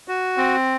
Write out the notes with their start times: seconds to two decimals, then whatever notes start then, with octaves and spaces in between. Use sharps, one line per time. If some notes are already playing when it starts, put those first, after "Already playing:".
0.08 F#4
0.37 C4